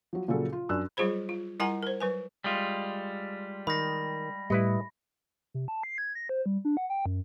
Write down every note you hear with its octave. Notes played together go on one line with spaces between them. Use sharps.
F3 F#3
A#2 C#3 F3 F#3 G#4 A4
F4
F#2 D4 E6 F#6
F#3 G3 F4 G#4 C5 B5
F4
G3 E4 A#4 F#5 G#5 A#5
A#4 C5
F#3 B4 G#5
G3 G#3 F4
D#3 B5 A#6
A2 G3 E4 B4 D#5
C3
A5
C7
G#6
A#6
C5
G3
D4
F#5
G5
F#2